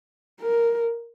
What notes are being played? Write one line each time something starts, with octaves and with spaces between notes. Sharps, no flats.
A#4